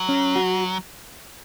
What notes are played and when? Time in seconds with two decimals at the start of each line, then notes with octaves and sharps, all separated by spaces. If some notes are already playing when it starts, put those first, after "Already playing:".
Already playing: F#3
0.09 C#4
0.36 F#4